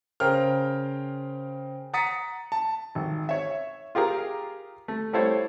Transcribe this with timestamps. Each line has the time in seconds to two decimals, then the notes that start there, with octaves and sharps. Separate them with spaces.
0.20 C#3 A#4 C5 G5 F6
1.93 F#5 A#5 D#6 A6 B6 C#7
2.52 A5
2.95 G#1
3.29 C#5 E5
3.95 F4 G4 G#4 A#4
4.88 A3
5.13 G3 A3 E4 A4 C5 C#5